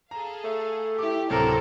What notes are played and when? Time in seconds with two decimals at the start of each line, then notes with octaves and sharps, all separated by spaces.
0.11 G#4 A4 F5 A#5
0.44 A3
0.99 E4 G4 D6
1.30 D1 C3 F#3 A4 A#4 C5 D5 G5